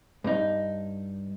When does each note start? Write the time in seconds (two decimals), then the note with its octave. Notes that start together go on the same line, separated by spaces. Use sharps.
0.24 G2 D#4